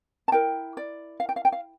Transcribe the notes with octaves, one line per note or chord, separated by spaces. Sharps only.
A5
E4 A#4 G5
D5
F5
G5
F5
G5
F5